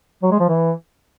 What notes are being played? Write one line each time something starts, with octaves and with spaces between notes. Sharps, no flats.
F#3
G#3
F3
E3